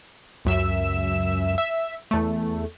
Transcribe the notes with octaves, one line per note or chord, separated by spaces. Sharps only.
C#2 F#2 E5 E7
E5
E2 A3